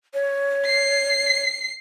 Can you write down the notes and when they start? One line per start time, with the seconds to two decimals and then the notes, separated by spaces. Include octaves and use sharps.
0.14 C#5
0.65 C7